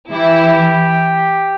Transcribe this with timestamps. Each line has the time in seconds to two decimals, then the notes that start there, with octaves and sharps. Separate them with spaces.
0.11 E3 E4 G4